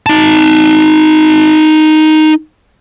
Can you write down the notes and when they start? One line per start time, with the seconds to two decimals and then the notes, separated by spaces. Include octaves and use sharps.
0.06 D#4 A5